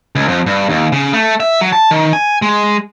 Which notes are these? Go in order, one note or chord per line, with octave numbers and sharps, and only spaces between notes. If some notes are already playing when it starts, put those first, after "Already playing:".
C#2
F2
G2
D#2
C#3
A3
E5
F#3
A5
D#3
G#5
G#3